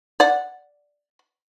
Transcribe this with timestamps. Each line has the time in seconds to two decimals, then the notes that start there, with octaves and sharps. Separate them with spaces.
0.20 D5 F#5